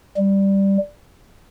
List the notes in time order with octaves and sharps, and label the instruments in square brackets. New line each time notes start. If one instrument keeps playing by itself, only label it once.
[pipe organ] G3